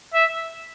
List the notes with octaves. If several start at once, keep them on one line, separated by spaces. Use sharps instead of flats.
E5